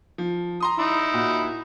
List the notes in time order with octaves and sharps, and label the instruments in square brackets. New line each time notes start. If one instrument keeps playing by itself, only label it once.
[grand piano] F3
A#5 C6 D#6
[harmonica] D#4 E4
[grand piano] A#2 F#4